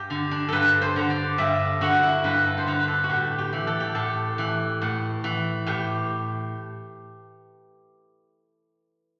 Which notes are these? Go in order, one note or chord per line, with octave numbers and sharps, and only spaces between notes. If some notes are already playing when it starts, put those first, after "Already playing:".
Already playing: G2 G4
D3
D4
G2 A4 B4
C5
D3
D5
G2 E5
D3 F#4
E4
G2 B4
A4
C5
D3 B4
B4
A4
F#4
A2 G4
G4
E3
A4
G4
A2 A4
E3
A2
E3
A2 G4